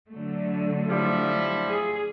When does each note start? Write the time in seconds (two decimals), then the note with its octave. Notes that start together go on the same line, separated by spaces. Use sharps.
0.11 D3 F#3 A3
0.89 F3 G3 E4
1.68 G#4